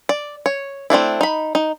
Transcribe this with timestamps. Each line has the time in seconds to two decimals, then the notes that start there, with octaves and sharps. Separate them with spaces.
0.09 D5
0.46 C#5
0.90 A3 C4 D4 E4
1.21 D#4 B5
1.55 D#4